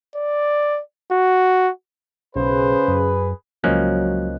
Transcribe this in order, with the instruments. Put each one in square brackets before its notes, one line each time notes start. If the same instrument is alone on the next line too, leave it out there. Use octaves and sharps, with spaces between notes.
[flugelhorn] D5
F#4
[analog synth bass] B1 [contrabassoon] C#3 [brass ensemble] G#4 B4 [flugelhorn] C5
[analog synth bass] F#2
[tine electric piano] C#2 D#5 F#6 [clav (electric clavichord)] F3 A#3 C#4 [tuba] F#3